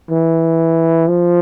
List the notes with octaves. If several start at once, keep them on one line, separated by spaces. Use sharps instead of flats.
E3
F3